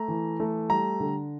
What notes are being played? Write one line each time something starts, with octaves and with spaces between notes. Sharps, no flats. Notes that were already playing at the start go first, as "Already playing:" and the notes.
Already playing: A3 A#5
E3
A3
G3 A#5
D3